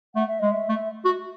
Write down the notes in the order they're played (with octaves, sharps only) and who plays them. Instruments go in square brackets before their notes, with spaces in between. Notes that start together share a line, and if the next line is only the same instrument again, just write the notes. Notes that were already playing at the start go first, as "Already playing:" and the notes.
[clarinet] A3 [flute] F#5
[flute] E5
[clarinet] G#3 [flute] D#5
[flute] E5
[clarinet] A3
F#4